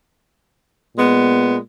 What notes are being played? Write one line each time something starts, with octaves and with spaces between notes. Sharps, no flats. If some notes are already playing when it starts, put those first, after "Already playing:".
A#2 G#3 B3